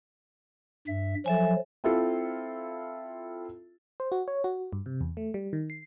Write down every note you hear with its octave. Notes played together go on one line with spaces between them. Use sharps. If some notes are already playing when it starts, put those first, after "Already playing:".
G2 E5
F3 F#3 A4 E5 G#5
C4 E4 F4 A4
C5
F#4
C#5
F#4
G2
C3
E2
A3
G3
D#3
C7